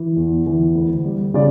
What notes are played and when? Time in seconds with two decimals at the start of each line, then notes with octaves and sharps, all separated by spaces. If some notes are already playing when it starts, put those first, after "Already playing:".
Already playing: E3
0.16 E2
0.47 E3
0.75 D2
1.05 G3
1.34 C#3 D5